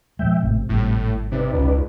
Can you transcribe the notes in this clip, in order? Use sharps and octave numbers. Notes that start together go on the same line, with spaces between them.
A#2 F3 G#3 E5 G5
G#1 A2 C3 A3
G#1 A2 G3
C3 D#4 B4 D5
C#2